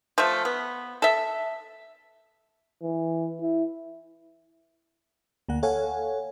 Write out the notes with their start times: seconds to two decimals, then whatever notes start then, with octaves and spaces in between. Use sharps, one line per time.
0.18 F3 A3
0.45 B3
1.02 A4 E5
2.83 E3
3.41 E4
5.49 D2 A#3 F#5
5.63 A4 C#5 F5 F#5 G#5